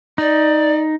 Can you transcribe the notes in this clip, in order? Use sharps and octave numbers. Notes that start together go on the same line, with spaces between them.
D#4 D5